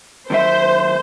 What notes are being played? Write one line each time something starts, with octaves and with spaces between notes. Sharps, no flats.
D#2 F#3 C5 E5